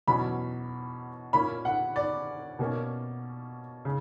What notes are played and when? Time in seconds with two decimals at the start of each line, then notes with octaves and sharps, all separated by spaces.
0.07 E2 B2 F#3 C#4 B5
1.33 A#2 A#3 C#4 B5
1.65 F#5
1.96 D5
2.59 B2 A#3 C#4
3.85 C#3